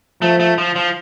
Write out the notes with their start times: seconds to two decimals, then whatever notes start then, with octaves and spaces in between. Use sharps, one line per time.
0.22 F3 A3
0.40 A3
0.58 F3
0.76 F3